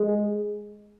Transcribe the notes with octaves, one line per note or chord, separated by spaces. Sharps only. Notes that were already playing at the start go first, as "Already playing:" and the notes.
Already playing: G#3